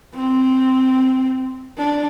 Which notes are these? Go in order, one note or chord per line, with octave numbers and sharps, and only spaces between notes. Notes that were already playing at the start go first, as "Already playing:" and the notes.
C4
D4